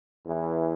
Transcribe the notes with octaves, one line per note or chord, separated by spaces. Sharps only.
E2 E3